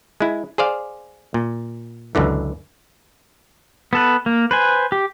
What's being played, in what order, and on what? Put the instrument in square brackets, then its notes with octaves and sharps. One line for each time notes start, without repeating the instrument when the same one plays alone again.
[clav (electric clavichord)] G#3 E4
G#4 C5 D5 F5
A#2
C#2 F#2 D3 E3
[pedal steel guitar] B3 A4 B4
A#3
B4 C5 G#5
G4